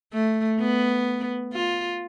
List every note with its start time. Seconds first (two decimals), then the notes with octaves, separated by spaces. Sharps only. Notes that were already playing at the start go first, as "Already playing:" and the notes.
0.13 A3
0.60 B3
1.53 F4